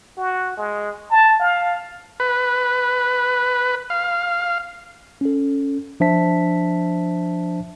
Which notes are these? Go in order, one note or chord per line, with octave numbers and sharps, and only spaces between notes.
F#4
G#3
A5
F5
B4
F5
C#4 A4
F3 D4 C5 E5 A5 B6